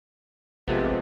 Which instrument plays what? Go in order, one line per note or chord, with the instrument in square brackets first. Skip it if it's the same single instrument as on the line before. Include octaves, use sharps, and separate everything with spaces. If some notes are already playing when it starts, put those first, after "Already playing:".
[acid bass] A#1 [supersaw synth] C3 [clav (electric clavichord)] G#3 A3 B3 [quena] F4